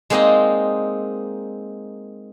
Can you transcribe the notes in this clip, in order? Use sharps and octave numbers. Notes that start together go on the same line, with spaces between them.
G#3 A#3 C4 D#4 D5 D#5